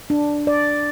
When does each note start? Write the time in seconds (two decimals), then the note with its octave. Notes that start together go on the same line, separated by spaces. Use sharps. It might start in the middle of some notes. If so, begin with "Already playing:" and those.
0.10 D4
0.47 D5